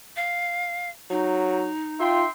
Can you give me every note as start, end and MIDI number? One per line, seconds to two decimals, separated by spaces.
0.16 0.89 77
1.10 1.70 54
1.10 2.25 63
2.00 2.22 65
2.00 2.29 76
2.00 2.29 79
2.00 2.29 84